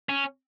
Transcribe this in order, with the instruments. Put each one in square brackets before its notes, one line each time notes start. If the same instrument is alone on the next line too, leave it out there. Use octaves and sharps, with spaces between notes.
[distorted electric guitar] C#4